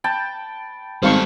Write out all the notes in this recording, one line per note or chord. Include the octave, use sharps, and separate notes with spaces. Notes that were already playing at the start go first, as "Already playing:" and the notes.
G5 A5 B5
G#1 G3 A4 C5 F5 C#6